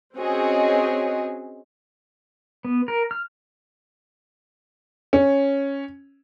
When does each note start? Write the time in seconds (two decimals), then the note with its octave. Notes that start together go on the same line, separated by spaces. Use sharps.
0.16 C4 C#4 F#4 G#4 C#5 D#5
2.65 B3
2.88 A#4
3.11 F6
5.13 C#4